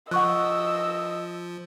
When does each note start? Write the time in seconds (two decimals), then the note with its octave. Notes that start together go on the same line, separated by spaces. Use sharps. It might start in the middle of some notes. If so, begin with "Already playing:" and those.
0.11 F3 D#5 F#5 C#6 E6 F#6